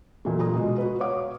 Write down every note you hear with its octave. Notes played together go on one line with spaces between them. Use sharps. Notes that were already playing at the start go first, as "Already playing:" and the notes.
E2 A#2 F#3 A3
A#2 A#5 D#6
B2 G#3
F#4 B4
C#5 F5 F#5 D6 D#6